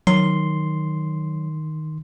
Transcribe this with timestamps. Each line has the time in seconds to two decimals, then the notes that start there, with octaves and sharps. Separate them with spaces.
0.07 D#3 F#3 C6